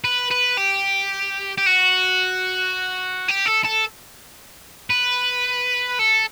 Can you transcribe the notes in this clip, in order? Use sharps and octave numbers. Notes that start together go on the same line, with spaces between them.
B4
B4
G4
G4
F#4
G4
A4
A4
B4
A4